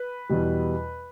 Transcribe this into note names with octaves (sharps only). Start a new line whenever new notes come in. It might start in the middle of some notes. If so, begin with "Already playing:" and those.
Already playing: B4
E2 B2 G3